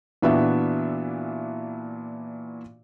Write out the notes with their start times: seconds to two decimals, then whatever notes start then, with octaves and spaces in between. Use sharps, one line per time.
0.22 A#2 E3 B3 D4 F#4 E5